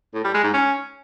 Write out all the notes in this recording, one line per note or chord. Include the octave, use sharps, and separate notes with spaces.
A2
G3
G#3
G#2
C#4